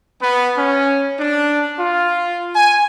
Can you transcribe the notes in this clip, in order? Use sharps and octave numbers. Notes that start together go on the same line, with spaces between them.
B3
C#4
D4
F4
G#5